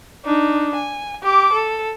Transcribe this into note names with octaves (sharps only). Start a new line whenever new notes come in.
D4 D#4
G#5
G4 D6
A4